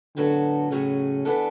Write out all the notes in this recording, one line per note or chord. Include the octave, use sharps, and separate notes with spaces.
A2 D3 F#3 B3 F#4 A4
A2 C#3 F#3 C#4 G#4
E3 B3 D4 A4